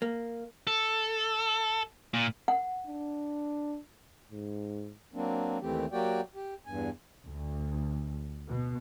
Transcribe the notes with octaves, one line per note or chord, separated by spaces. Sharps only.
A#3
A4
A#2
F#5
D4
G#2
F#3 A#3 C4 D4
D#2 E3 A3 C4 G4
F#3 A#3 F#4 G4 D5 G5
G4
E2 G2 G#5
D2
B2